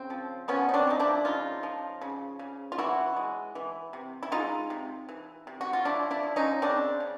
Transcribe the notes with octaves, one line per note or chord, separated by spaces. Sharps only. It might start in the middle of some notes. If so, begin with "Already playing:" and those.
Already playing: C#3 C4
F3
F3 B3 C#4
D#4
C4 D4
F3 D#4
D4 E4
C#3 D#4 F4
F3
C#3
C#3
F4
E3 E4 F#4
G#3
E3
C3
E4
G#3 D#4 F4
C3
E3
C3
F#4
F4
F3 D4 E4
D4 E4
F3
C#4 D#4
C#3 C4 D4
C#3